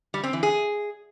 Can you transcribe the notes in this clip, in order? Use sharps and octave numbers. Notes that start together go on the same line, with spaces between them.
G3
C4
E3
G#4